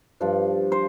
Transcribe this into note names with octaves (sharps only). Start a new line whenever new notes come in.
G2 F3 D4
C5